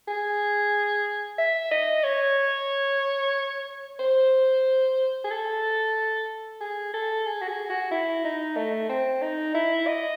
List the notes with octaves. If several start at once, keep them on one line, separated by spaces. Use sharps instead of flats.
G#4
E5
D#5
C#5
C5
G#4
A4
G#4
A4
G#4
F#4
G#4
F#4
E4
D#4
A3
C4
D#4
E4
D#5